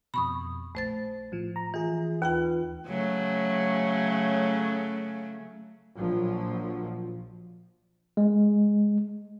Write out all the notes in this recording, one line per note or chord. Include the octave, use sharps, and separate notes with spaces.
F2 B2 B5 C#6 D#6
A#1 A3 C5 A6
A2 F3
A#5
E3 F4 G#4
D#2 F4 B4 G5
C#3 F#3 A3
A#1 F3 F#3
G#3